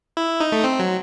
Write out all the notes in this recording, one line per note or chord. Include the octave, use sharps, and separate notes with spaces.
E4
D#4
A3
C4
F#3